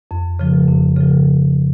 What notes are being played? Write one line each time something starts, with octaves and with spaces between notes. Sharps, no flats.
F2
C#3 F3
F2
C#3 F3